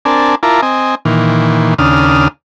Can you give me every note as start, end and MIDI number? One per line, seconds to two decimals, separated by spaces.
0.05 0.35 60
0.05 0.35 62
0.05 0.35 70
0.05 0.35 74
0.05 0.35 80
0.05 0.35 81
0.43 0.61 64
0.43 0.61 65
0.43 0.61 70
0.43 0.61 81
0.43 0.61 82
0.43 0.61 86
0.62 0.95 60
0.62 0.95 75
0.62 0.95 80
1.05 1.74 46
1.05 1.74 51
1.05 1.74 52
1.79 2.28 39
1.79 2.28 49
1.79 2.28 62
1.79 2.28 87
1.79 2.28 89